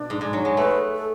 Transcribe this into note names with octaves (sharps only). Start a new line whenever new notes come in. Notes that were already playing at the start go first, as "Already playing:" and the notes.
Already playing: B2 D4
G#2
G#2
F#3
G#3
A3 B4
A4